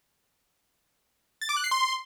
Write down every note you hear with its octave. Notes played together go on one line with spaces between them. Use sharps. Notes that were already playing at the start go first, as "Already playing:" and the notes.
A6
D6
F#6
C7
C6